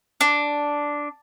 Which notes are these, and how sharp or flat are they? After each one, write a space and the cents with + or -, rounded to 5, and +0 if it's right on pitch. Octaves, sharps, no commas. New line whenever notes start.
D4 -5